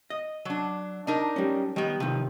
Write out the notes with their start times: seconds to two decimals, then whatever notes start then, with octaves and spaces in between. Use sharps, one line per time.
0.10 D#5
0.45 F#3 D4
1.07 D4 D#4 A#4
1.36 G3 C#4
1.76 D#3 G3 B3
2.00 C3 D#3 F3